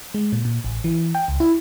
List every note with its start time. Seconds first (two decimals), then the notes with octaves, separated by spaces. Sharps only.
0.14 G#3
0.32 A#2
0.45 A#2
0.64 A1
0.84 E3
1.15 G5
1.28 C#2
1.40 E4